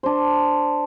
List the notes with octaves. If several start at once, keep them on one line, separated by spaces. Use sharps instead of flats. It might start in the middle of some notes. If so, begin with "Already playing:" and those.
D4 C5